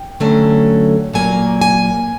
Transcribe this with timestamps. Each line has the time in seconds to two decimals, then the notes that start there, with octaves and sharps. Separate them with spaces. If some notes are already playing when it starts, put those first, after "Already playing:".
Already playing: G5
0.20 D3 F#3 A3 C#4
1.13 A#2 F#3 A#3 G#5
1.61 G#5